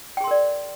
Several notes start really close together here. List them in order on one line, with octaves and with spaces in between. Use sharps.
G5 G#4 C6 A#4 D5